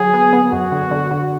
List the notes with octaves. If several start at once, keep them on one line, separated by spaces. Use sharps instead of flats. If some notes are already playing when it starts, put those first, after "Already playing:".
Already playing: D3 F#3 G#4
B3
B3
F#2 F#4
D3
D3
D3